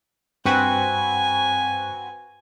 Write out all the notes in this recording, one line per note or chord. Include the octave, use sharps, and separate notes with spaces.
G2 C4 F#4 B4 G5 G#5